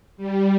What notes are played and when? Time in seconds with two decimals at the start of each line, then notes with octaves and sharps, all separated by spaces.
0.17 G3